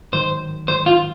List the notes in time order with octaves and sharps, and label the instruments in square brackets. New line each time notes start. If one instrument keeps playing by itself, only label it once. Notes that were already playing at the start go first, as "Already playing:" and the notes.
[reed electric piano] G#2 D#3 F#3 [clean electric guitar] C5
[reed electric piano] G#2 D#3 F#3 [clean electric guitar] C5
[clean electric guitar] F4